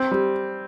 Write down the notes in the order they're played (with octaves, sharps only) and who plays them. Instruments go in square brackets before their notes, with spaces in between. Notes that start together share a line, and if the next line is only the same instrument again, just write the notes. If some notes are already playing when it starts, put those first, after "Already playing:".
Already playing: [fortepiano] C4
G3